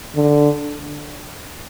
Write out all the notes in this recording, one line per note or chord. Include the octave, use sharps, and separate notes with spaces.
D3